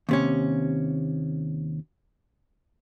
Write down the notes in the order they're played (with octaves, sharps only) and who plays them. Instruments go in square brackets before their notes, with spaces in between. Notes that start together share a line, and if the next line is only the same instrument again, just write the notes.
[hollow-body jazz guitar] D#2 C3 C#4